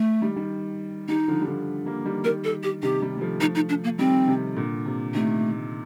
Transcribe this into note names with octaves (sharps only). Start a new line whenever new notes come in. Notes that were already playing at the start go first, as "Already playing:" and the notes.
Already playing: A3
D#3 G3
D#3 G3
D#3 G3 D#4
D3 F3
G3
D3 F3
G3 A#3
D#3 G3
D#3 G3 A#4
A4
G4
C3 D#3 G4
D#3 G3
G3
F3 A3
F3 A3 D#4
D#4
D4
A#3
D#3 G3 C4
C3 D#3
A#2 D3
C3
C3 D#3 A3